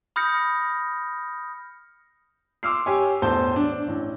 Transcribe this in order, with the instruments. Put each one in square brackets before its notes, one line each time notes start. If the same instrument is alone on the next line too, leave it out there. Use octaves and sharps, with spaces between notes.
[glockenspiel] B5 D#6 F6 G6 A#6 C#7
[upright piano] C6 D6 E6 F6 C7
G4 C#5 G#5
E2 A2 C5 A5 G6
D4
A1